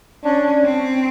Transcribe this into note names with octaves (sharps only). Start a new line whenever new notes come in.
C#4 D4
C4